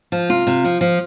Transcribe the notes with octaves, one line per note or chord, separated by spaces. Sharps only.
F3
C3 F4
C3
F3
F3